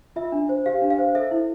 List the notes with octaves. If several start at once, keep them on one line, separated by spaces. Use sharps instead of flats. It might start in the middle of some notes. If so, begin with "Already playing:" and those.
F4 E5
D4
C5
G4 F5
D4
F5
C5
A4 E5
E4